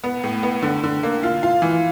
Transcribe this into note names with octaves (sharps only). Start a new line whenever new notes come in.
B3
A2
B3
D3
D3
A#3
F4
F4
E3